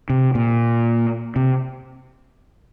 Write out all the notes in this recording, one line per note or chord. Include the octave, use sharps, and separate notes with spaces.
C3
A#2
C3